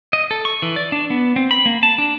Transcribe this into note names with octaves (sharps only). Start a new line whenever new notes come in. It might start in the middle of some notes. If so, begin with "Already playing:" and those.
D#5
A4
C#6
E3
D5
D4
B3
C4
B5
A#3
A5
D4